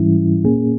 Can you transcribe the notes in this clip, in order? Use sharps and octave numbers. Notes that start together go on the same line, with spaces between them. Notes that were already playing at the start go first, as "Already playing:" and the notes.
Already playing: G#2 E3 G3 C#4 E4
A#2 A#3 C#4 G#4